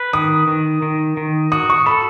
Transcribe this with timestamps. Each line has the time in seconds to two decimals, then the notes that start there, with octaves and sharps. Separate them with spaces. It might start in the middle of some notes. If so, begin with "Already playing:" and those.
Already playing: B4
0.13 D#3 D#6
0.48 D#3
0.82 D#3
1.17 D#3
1.52 F#4 D#6
1.70 C#6
1.86 A4 B5